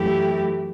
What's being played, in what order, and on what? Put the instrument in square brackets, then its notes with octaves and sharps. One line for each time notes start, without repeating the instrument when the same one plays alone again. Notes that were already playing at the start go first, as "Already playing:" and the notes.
Already playing: [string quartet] F#2 E3 A3 E4 G4